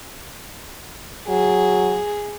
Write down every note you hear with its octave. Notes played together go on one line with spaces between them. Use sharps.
F#3 G#4